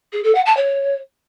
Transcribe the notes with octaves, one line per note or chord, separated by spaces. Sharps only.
G#4
A4
F#5
A5
C#5